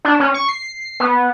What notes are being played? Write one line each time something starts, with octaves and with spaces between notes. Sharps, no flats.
D4
C#4
C#6
C7
B3